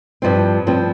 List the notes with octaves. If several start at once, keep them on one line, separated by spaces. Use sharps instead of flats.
G2 F3 C4
G2 F3 C4